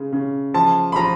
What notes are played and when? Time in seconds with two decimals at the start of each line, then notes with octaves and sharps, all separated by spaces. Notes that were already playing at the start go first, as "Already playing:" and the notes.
Already playing: C#3 G#3
0.12 C#3
0.54 F3 A5
0.92 B5
0.96 F3 A#5